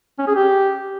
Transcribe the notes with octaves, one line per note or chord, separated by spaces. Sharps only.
C#4
G#4
G4